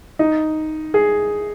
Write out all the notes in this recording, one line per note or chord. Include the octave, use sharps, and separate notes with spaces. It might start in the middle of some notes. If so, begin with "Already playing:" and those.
D#4
G#4